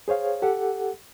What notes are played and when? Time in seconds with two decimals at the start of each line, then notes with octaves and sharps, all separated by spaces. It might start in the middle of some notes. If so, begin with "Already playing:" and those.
0.08 G#4 C5 C#5 F5
0.42 G4 A4 F#5